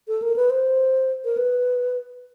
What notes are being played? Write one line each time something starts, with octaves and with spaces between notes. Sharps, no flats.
A4
A#4
B4
C5
A#4
B4